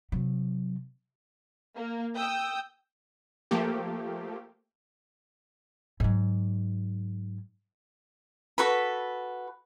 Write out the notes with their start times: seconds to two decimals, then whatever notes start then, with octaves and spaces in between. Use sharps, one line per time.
0.12 C3 F#3
1.75 A#3
2.16 G5 D#6 E6 G6
3.51 F3 A3 A#3 G4
6.00 G#2 F#3
8.58 F#4 A4 B4 B5